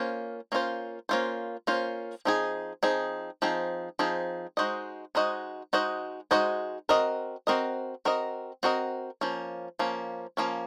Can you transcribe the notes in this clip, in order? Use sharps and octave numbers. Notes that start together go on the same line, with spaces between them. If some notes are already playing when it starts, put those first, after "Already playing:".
Already playing: A#3 C#4 F4 C5
A#3 C#4 F4 C5
A#3 C#4 F4 C5
A#3 C#4 F4 C5
F3 C4 D#4 G#4
F3 C4 D#4 G#4
F3 C4 D#4 G#4
F3 C4 D#4 G#4
G#3 D#4 F#4 C5 D#5
G#3 D#4 F#4 C5 D#5
G#3 D#4 F#4 C5 D#5
G#3 D#4 F#4 C5 D#5
C4 F#4 A#4 D#5
C4 F#4 A#4 D#5
C4 F#4 A#4 D#5
C4 F#4 A#4 D#5
F3 A#3 C#4
F3 A#3 C#4
F3 A#3 C#4